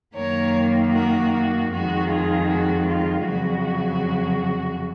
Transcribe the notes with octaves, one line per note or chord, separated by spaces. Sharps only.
F#2 D#3 A#3 A#4 C#5
F#4 A#4
F#4
F2 D#3 G#3 F#4
F4 G#4
F#4
F4
F2 C#3 F#3 F#4